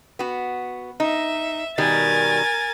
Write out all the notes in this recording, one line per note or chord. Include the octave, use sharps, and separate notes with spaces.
B3 F#4
D#4 E5
B2 D#3 G3 A#4 G#5 A6